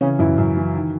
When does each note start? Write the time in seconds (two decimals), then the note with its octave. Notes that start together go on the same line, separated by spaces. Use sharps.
0.01 C#3 E3 C#4
0.19 F#2 E3 E4
0.38 F#2
0.57 E3
0.75 D#3